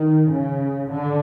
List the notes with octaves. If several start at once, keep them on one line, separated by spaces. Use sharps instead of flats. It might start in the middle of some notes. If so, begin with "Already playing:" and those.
Already playing: D#3
C#3
D3